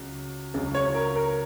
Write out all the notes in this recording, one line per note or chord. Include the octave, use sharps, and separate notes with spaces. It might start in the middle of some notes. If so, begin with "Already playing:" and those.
Already playing: C#2 C#3 F#3
C#2 C#3 F#3
C#5
A#4
A#4